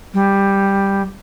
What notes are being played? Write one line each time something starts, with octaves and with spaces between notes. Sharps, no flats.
G3